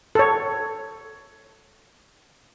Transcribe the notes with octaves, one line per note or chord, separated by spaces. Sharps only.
A4 C#5